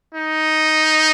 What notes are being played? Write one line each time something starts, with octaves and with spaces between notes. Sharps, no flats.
D#4